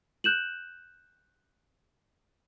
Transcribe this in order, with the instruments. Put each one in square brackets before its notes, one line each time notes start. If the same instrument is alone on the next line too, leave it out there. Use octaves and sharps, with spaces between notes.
[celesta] F#6 G6 E7 F#7